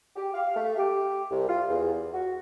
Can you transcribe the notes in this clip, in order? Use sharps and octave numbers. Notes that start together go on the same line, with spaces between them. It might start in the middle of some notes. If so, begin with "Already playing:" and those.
G4
F5
A3
G4
C2
F4
E2
F#4